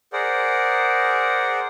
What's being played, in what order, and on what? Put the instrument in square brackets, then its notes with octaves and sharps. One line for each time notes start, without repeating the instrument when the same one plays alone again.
[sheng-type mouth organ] G#4 A#4 C5 D5 F#5